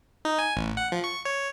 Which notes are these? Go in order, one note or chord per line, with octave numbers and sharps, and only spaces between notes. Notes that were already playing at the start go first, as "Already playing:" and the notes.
D#4
G#5
A1
F#5
F3
C#6
C#5